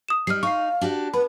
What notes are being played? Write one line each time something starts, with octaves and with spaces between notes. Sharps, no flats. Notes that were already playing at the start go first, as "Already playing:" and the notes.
D#6 E7
G3 D#4 F6 C7
D#4 F5 C#6 C7
D4 F#4 G4
B3 B4 B5